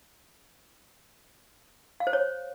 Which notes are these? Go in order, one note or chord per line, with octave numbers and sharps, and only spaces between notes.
F5
C5
C#5